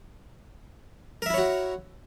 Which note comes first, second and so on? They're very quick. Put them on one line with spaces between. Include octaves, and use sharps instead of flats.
A#4 E5 E4 C#5 F#4